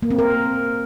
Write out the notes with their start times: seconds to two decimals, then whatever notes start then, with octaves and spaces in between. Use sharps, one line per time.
0.03 A#3
0.11 C4
0.19 A#4